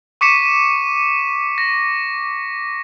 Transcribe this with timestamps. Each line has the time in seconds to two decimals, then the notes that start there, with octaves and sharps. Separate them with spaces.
0.21 C#6 D6 B6 C#7 D#7 E7
1.58 A#6